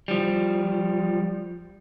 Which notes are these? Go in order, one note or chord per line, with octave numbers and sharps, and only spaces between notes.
F3 G3